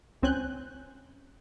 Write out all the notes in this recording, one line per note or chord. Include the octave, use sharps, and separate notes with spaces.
C#2 C4 C#4 G#5 F#6 G6